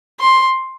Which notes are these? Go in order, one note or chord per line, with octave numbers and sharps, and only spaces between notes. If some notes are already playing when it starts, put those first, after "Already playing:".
C6